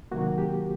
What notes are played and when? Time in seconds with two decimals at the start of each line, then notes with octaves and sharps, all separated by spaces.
0.11 C3 D#3 F#3 A#3 F#4
0.38 G4